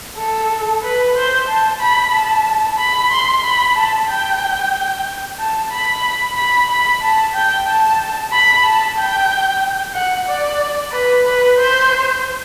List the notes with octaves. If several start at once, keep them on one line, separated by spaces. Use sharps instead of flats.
A4
B4
C5
A5
B5
A5
B5
C6
B5
A5
G5
A5
B5
B5
B5
A5
G5
A5
B5
A5
G5
F#5
D5
B4
B4
C5